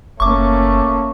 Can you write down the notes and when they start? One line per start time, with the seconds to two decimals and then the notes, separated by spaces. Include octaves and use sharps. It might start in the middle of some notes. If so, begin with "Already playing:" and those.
0.20 F#1 A3 A#3 C#4 C#6 D6